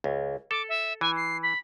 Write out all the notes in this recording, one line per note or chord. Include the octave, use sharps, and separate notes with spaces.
C#2
A4 D6
E5
E3 G#5
C7
B5